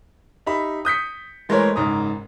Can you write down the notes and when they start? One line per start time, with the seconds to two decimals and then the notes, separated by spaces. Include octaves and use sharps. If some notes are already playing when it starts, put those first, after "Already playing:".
0.46 D#4 G4 E5 B5
0.85 D#6 G6 B6 C#7
1.49 E3 G#3 A3 A#4 C5 C#5
1.76 F#1 G#2 A#5 D#6